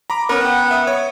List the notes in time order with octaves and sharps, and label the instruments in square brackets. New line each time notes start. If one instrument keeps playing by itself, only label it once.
[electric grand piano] A#5 B5 D6
[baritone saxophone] B3 [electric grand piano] C#4 A#4
[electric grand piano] F#5 G5
E5 D#6
C#5